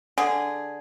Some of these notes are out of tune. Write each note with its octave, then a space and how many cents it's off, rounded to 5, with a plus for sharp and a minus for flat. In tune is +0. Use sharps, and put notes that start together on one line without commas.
D3 +0 G#4 +0